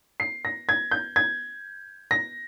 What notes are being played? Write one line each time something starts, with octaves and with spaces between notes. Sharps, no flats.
C7
A#6
G#6
G6
G#6
A#6